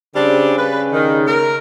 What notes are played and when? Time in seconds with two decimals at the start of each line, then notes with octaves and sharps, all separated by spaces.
0.16 C#3 G3 C4 D4
0.58 B4
0.92 D#3
1.27 A#4